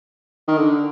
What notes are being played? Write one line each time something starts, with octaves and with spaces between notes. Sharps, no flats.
D#3
D3